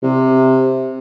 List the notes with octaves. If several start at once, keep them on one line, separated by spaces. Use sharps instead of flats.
C3